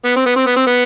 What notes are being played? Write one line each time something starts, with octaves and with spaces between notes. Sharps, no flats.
B3
C4
B3
C4
B3
C4
B3